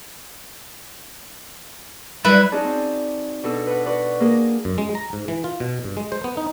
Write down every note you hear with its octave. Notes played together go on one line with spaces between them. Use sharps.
G3 E4 B4
C#4 D#4 F#4 G#4 D5 A5
C4
B2 D4 A4
B4 F#5
F#4 B4 D5
A#3 G#4 A#4
F#2
G#3
A#5
G#2
E3
F4
B2
G2
G#3
C5
B3
D#4